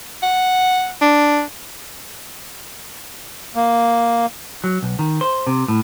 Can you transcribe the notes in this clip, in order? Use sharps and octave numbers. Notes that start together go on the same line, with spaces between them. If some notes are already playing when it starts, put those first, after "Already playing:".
F#5
D4
A#3
F#3
B1
D#3
C5
C3
A2